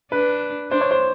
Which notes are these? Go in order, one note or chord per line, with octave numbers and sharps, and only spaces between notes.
D4 B4
D4 C5
C#5
C5